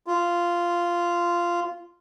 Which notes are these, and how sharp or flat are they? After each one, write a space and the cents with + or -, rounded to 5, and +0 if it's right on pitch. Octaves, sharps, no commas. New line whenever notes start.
F4 -10